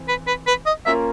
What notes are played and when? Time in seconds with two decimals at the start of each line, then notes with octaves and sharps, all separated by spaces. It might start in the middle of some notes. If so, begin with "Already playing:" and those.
Already playing: E3 C4
0.08 B4
0.27 B4
0.47 B4
0.66 D#5
0.86 A#3 C#4 F4 A#4 E5